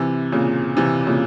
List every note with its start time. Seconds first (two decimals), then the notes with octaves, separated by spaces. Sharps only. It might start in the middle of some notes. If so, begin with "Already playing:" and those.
Already playing: C3 E3
0.32 A#2 C#3
0.77 C3 E3
1.07 A#2 C#3